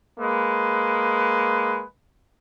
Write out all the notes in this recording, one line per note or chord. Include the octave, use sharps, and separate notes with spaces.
G#3 A#3 B4